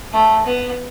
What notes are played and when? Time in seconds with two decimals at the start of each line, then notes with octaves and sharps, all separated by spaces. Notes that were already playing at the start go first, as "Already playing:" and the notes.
0.13 A3
0.45 B3